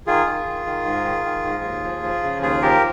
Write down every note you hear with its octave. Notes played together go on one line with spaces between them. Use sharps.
D#3 F4 G#4
D#3
D#3
D#3
G#2
D#3
D#3
G#2
D#2
F3
F3
C#3
D#2 F4 G#4
F3 G4 A#4